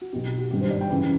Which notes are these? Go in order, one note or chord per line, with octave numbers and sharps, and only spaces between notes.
F#4
B1 B2 G4
G4
F#4
G#1 G2 D#3 G4
C5
D5
G5
F#2 C#3 E3